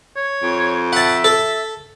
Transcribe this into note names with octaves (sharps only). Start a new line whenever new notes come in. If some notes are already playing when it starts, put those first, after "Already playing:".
C#5
F2
E5 F#5 A5
A4